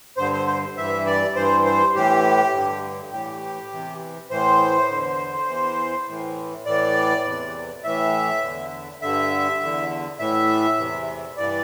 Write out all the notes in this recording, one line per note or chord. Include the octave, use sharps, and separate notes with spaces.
G2 D3 C5
C5
C5
G2 E3 E5
D5
G2 E3 C5
C5
A2 E3 G4
G2 D3
A2 E3 G4
E2 C3 E3
A2 E3 C5
E2 D3
E2 E3
A2 E3
A2 E3 D5
E2 C3 E3
A2 E3 E5
E2 D3
G2 D3 E5
E2 D3
A2 E3 E5
E2 C3 E3
G2 E3 D5